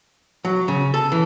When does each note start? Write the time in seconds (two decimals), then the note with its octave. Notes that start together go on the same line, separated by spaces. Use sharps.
0.45 F#3
0.68 C#3
0.94 A4
1.12 E3